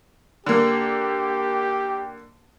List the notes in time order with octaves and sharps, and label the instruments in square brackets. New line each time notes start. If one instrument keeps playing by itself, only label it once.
[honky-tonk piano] D3 A#3 [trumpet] G4